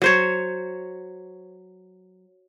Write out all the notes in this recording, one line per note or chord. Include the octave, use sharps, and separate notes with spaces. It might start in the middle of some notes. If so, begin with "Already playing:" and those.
F#3 C5 C#5